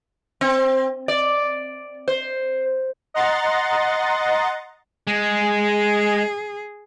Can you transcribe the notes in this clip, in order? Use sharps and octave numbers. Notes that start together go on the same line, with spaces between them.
C4
D5
C5
D#5 F#5 A#5 C6 A6
G#3
G#4